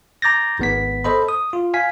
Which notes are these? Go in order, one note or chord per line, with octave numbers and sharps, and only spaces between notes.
A#5 D6 G6 A6 A#6
G#1 B3 B6
A4 C5 D#5 B5
D#6
F4
F5 G#5 B6